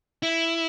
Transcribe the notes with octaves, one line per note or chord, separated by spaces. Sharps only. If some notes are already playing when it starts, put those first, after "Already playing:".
E4